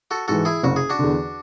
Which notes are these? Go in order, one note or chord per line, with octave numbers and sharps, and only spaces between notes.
F#4 A4
G#2 E3 F#4 A4
E4 G#4
F#1 F#4
G#4
D4 F#4
E2 D3